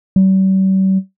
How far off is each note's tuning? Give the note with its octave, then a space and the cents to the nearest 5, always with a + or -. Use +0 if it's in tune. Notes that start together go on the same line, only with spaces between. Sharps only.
G3 -45